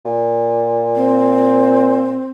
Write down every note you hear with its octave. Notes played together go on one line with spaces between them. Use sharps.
A#2
C4